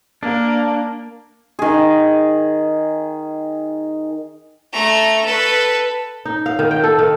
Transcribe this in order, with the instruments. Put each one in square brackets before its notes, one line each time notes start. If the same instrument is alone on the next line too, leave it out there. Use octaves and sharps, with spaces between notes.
[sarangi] A#3 [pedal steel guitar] D4
[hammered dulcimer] D#3 G#4
[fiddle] A3 A#5
A4 B4
[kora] D#4
F5
D#3
G5
A4
D#3